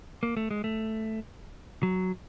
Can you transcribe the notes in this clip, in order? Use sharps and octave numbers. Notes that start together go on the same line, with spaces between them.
A#3
A3
G#3
A3
F#3